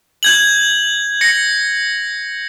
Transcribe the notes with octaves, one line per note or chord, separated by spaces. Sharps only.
G6 G#6 F#7
A#6 C#7